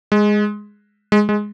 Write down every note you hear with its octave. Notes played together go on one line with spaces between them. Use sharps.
G#3
G#3
G#3